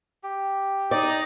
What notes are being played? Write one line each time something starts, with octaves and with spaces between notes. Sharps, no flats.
G4
D#4 D5